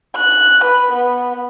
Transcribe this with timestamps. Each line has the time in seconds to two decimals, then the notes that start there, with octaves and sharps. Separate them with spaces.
0.17 F#6
0.64 B4
0.93 B3